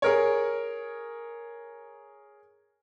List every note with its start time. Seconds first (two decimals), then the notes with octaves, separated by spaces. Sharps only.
0.02 G#4 A#4 C#5